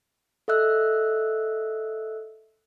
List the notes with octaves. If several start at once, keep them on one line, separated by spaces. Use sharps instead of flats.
A4 D#5 E5 E6 F#6